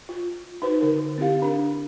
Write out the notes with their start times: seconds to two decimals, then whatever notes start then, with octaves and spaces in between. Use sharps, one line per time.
0.09 F4
0.62 D#4 F#4 B4 C5
0.81 D3 A#4
1.18 C4 E4 G4 F5
1.42 D4 A#4 B5